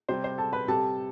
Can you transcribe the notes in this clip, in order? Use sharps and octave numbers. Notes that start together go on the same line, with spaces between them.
C3 G3 C5
C5
A4 A5
B4 B5
C3 G3 A4 A5